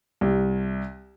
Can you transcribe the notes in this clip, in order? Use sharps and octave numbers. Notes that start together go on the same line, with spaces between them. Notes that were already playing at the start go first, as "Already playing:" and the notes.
C2